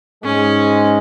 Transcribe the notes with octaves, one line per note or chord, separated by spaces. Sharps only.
G#2 G#3 C#4